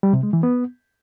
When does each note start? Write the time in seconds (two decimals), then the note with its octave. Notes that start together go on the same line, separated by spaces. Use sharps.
0.03 G3
0.13 C3
0.23 G#3
0.33 E3
0.43 B3